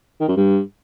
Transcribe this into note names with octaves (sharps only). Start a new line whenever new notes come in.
D#3
F#2
G2